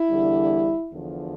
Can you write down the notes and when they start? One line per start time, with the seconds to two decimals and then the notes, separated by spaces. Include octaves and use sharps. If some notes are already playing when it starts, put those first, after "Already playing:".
Already playing: E4
0.09 E2 D3 G3
0.91 E2 D3 F3